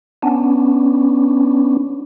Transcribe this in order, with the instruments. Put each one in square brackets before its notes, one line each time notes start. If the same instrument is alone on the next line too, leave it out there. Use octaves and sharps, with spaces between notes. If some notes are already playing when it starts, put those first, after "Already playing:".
[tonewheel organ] B3 C#4 D4